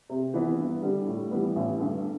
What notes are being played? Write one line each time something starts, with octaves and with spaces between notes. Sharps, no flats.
C3
E3 B3
G2
D3 G3
A2
E3 G3 B3
A1
G2 D3